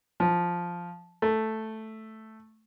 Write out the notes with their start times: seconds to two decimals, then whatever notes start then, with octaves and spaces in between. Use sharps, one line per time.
0.20 F3
1.22 A3